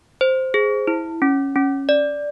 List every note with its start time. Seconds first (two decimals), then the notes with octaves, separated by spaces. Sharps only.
0.21 C5
0.54 G#4
0.87 E4
1.22 C#4
1.56 C#4
1.89 D5